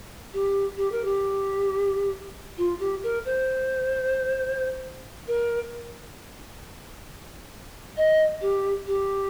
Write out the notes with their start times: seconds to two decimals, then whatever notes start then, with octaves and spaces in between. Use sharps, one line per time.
0.33 G4
0.77 G4
0.92 A#4
1.05 G4
2.58 F4
2.80 G4
3.03 A#4
3.25 C5
5.28 A#4
7.97 D#5
8.41 G4
8.87 G4